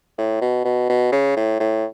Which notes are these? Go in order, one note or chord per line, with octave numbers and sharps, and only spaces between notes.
A2
B2
B2
B2
C#3
A2
A2